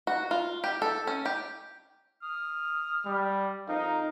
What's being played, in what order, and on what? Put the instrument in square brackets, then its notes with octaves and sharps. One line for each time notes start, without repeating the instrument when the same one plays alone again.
[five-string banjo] F#4
F4
G4
A4
C#4
G4
[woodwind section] D#6 F6
[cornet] G3
[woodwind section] F2 A#4 F5 [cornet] D#4